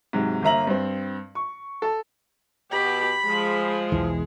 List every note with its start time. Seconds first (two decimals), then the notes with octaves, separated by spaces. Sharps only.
0.13 G#2 C3 F#3
0.42 G1 A#3 E5 A#5 F#7
0.67 G2 C4
1.35 C#6
1.82 A4 A5
2.71 B2 G4 B5
3.25 F3 G#3 G#4
3.92 B1 E2 E3